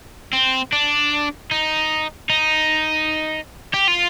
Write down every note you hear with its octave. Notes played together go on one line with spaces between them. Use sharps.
C4
D4
D#4
D#4
G4
F4